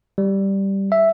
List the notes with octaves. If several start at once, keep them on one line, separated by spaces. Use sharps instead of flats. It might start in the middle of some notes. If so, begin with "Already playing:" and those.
G3
E5